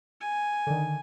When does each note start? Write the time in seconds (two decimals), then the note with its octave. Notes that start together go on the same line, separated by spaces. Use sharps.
0.21 G#5
0.67 D3 D#3